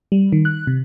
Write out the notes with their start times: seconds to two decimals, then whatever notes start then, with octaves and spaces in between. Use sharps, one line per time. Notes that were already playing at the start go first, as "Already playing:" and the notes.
0.12 G3
0.32 D#3
0.45 F#6
0.67 C3